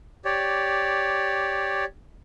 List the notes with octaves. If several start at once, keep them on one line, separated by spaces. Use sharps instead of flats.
G4 C#5 D5